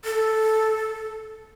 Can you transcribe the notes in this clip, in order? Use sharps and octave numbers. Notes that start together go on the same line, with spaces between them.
A4